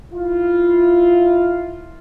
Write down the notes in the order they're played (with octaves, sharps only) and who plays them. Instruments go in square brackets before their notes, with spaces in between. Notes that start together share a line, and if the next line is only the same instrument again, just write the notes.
[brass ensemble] E4 F4